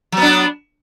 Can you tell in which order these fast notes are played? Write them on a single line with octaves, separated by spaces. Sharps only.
F#3 B3 D4